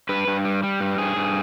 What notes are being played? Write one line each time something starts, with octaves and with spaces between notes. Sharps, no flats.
G2 B4
G2
G3
G3
G2
G2 G#4
G2